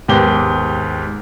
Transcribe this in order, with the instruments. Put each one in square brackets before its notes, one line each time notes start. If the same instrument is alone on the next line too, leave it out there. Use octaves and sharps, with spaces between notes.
[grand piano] D#2 G#2 B3 G4 G7